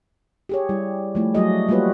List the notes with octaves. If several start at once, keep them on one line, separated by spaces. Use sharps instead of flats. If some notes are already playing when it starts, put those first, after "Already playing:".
G4 G#4 C#5
G3 E4
F3 A3 E4
F#3 G3 A3 F#4 G#4 D#5
G3 A#3 F4 F#4 B4 C#5